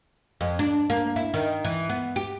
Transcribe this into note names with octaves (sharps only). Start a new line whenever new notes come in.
F2
D4
A#3
E4
D#3
E3
B3
G4